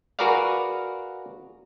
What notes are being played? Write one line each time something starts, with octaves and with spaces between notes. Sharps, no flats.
F#4 G#4 A#4 B4 D5 F5